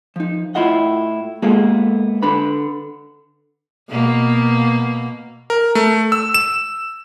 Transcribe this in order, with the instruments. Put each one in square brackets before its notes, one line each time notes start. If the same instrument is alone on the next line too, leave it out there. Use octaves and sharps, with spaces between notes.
[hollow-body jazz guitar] F3 D#4
A2 E4 F4 D#5 F#5
G#3 A#3 B3 F4 G#4 A4
D3 D4 B4 B5
[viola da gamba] B2 A#3
[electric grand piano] A#4
A3
E6
E7